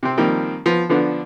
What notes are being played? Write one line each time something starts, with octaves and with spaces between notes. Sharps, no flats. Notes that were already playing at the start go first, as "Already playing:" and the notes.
C3 C4
D#3 F3 G3 A#3 C4
F3 B3
D3 F3 B3 D4